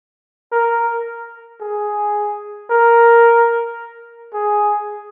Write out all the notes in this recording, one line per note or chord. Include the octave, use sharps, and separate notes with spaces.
A#4
G#4
A#4
G#4